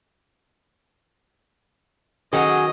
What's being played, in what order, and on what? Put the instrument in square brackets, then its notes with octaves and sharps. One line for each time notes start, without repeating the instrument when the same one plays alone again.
[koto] D#3 F#3 C#4 [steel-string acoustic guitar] F#4 G#4 [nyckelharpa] D#5